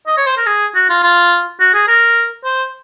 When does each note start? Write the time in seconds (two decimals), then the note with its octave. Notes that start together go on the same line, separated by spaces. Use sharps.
0.07 D#5
0.17 C#5
0.27 C5
0.37 A#4
0.47 G#4
0.75 F#4
0.89 F4
1.03 F4
1.60 F#4
1.74 G#4
1.88 A#4
2.44 C5